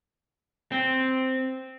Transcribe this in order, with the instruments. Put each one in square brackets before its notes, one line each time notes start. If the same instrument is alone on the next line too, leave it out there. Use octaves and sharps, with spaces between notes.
[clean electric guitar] C4